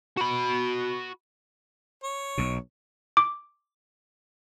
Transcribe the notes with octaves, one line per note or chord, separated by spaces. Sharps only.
F#4 B5
C#5
B1 B2
D6